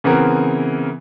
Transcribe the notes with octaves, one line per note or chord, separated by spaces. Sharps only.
C#3 E3 B3 C4 A#4